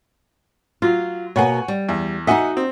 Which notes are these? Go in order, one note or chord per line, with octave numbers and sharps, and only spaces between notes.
F#3 F4
B2 A#3 C#5 F#5 G#5
G3
E2
D#4 F#4 D#5 E5 F#5 G#5
C4